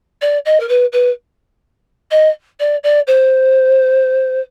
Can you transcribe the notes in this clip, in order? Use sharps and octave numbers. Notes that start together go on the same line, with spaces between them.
D5
D#5
A#4
B4
B4
D#5
D5
D5
C5